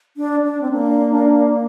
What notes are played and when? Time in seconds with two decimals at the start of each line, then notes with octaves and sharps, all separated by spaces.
0.17 D4
0.44 D4
0.61 C4
0.72 A#3 D4
1.12 D4